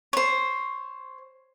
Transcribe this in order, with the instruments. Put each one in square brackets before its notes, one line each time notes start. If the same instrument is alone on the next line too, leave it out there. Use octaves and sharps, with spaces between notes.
[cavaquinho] C5 C#5